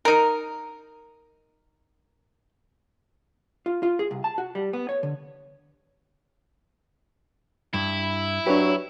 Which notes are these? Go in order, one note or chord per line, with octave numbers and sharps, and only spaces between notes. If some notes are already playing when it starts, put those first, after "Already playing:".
D#4 A#4
F4
F4
G#4
C2
A5
F#4
G3
B3
C#5
D3
G2 E4
F#3 D4 G4 B4 C#5